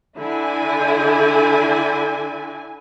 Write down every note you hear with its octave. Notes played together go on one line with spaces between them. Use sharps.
D3 D4 E4 G#5